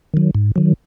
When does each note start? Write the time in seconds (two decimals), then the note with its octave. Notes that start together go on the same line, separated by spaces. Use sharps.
0.14 D#3 F#3
0.35 G#2
0.56 D#3 F#3